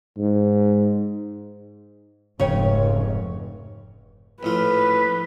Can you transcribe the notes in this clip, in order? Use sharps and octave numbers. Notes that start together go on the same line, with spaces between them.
G#2
F1 G#2 C#3 C#5 G5
A#1 A2 F4 B4